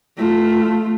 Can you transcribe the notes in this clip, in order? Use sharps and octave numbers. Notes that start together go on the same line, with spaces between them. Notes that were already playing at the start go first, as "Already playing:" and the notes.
A3 F4